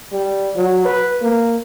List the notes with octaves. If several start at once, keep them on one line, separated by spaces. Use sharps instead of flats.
G3
F#3
B4
A#3